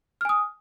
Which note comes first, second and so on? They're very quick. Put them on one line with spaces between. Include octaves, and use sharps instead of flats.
F6 G#5 D#6